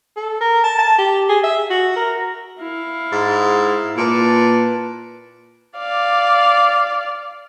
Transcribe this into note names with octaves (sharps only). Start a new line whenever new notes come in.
A4
A#4
A5
A5
G4
G#4
E5
F#4
A#4
E4 F5
G#2
A#2 B4 A5
D5 F5